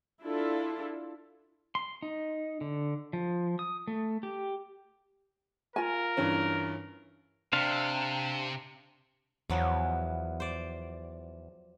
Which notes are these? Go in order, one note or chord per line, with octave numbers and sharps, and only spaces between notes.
D4 E4 F4 A4
C6
D#4
D3
F3
D#6
A3
G4
F4 A#4 G#5
G2 E3 C#4
C3 D4 C5 F5
E2 F3 F#3 B3
C5 D5